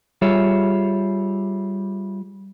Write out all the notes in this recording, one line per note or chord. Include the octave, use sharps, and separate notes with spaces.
G3 F4 G#4 C#5 E5